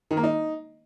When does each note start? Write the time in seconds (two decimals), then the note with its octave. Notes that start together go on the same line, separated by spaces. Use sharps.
0.11 D#3
0.17 A#3
0.23 D#4